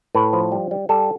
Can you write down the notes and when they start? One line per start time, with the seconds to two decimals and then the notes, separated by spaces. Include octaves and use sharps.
0.15 A2 B4
0.33 F3
0.52 G3
0.71 G3
0.89 G3 A4